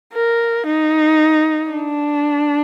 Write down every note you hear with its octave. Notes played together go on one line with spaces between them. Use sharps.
A#4
D#4
D4